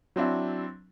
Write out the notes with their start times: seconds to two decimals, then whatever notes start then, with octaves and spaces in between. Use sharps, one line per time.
0.16 F#3 C4 D4 E4